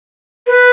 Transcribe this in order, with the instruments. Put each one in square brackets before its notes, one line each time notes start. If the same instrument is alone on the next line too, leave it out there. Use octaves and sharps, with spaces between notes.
[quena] B4